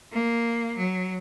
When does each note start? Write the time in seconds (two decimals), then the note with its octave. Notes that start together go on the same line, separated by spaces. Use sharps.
0.13 A#3
0.77 F#3